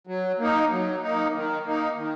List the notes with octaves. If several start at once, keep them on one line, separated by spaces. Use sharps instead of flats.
F#3
A#3 D#4
F#3
A#3 D#4
D#3
A#3 D#4
D#3